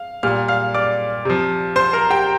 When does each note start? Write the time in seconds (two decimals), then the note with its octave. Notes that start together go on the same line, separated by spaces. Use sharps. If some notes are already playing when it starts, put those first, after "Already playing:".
Already playing: F5
0.23 A#2 G3 F5 F6
0.48 F5 F6
0.74 D5 D6
1.25 C3 F3
1.76 C5 C6
1.93 A#4 A#5
2.10 G4 G5